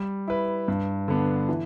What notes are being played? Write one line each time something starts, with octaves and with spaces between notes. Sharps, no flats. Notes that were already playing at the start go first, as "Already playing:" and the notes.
Already playing: G3
E4 B4
G2
D3 B3 D4
E3